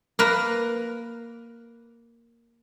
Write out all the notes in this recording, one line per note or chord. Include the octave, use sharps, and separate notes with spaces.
A#3 A#4 B4